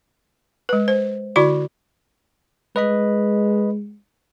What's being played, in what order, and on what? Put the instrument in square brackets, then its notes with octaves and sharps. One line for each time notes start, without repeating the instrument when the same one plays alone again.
[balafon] G#3 B4
C5
D3 E4 F#4 D5 D6
[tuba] G#3 [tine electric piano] B4 D#5 B5